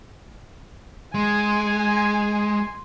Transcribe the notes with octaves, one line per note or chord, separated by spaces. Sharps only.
G#3 G#5 C6